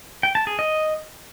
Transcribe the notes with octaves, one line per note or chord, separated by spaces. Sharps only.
G5
A5
G#4
D#5